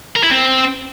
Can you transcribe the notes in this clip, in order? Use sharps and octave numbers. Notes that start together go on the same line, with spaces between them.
A#4
E4
C4